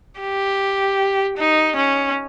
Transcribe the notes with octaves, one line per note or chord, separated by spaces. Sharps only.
G4
D#4
C#4